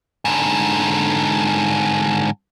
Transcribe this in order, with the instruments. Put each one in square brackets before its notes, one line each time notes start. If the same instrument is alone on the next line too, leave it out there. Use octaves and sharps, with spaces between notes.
[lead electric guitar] G#2 D3